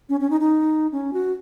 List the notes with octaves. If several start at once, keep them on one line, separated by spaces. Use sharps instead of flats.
C#4
C#4
D#4
D#4
C#4
F#4